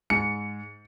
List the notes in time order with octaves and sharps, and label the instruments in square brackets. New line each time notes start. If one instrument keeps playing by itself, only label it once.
[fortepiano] G#2 [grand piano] C#7